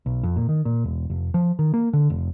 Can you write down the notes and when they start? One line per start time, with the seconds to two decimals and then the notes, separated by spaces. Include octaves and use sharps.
0.06 B1
0.23 F2
0.36 A#2
0.49 D#3
0.65 A#2
0.84 E1
1.10 F1
1.34 F3
1.59 D#3
1.74 A#3
1.93 D3
2.10 F1